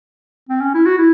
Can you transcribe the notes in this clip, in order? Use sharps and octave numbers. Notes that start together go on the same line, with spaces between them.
C4
C#4
E4
F#4
E4